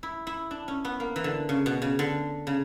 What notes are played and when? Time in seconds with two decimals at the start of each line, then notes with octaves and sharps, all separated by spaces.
0.03 E4
0.27 E4
0.51 D4
0.68 C#4
0.85 B3
1.00 A#3
1.16 E3
1.24 D3
1.49 C#3
1.66 B2
1.82 C#3
1.99 D3
2.47 C#3